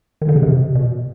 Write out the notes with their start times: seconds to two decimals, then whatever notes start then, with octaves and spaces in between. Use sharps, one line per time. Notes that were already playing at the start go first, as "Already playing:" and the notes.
0.21 D#3
0.29 D3
0.36 C#3
0.43 C3
0.75 B2